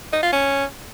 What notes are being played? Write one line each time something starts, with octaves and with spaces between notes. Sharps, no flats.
D#4
F4
C#4